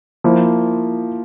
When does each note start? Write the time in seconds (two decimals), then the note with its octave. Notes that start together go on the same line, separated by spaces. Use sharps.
0.24 F3 A#3 E4